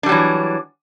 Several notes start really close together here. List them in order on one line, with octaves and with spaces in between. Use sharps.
D4 G3 F#3 E3